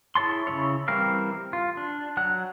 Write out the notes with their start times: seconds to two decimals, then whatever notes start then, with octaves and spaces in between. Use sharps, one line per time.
0.15 E4 G#4 C#5 A5 C6
0.47 C#3 G3 E4 C#5
0.88 E3 G3 C4 A#4 F5
1.53 F4
1.77 D4
2.17 F#3 F#5 F#6